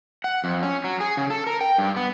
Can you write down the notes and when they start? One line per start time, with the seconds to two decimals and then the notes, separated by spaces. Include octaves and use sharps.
0.24 F#5
0.44 F2
0.63 C#4
0.84 F#3
1.00 G#4
1.17 C#3
1.30 A4
1.47 A#4
1.61 G5
1.78 G2
1.96 B3